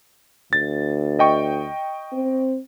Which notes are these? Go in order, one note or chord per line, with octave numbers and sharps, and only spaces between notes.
D2 A6
D#5 G5 C#6
C4